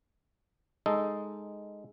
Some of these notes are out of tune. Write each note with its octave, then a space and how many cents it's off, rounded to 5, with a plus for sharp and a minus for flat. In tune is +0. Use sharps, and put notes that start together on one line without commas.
G#3 +0 D#4 +0 A4 +0